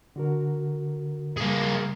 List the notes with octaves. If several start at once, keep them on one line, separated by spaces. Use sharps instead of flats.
D3 F#4 A#4
C#3 G3 A#3 G#4